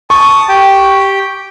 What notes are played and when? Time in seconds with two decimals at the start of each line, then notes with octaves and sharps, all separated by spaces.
0.10 A5 C#6 D#6
0.49 G4 G5